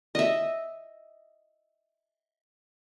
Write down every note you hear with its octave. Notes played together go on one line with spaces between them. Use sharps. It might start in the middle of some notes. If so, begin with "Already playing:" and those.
D#5 E5